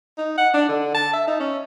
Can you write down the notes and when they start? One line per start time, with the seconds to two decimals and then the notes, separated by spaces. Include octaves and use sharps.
0.18 D#4
0.38 F#5
0.54 D4
0.69 D3
0.94 A5
1.13 E5
1.27 D#4
1.40 C#4